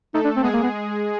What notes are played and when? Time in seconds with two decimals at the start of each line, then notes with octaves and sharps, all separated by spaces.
0.14 A3 D#4 A4
0.25 D4
0.37 C4
0.43 G#3 B3 G#4
0.54 A#3
0.63 B3